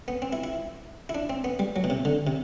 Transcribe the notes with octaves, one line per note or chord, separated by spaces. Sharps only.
B3
C4
E4
E4
E4
D4
C4
B3
G3
F#3
B2
C3
D3
C3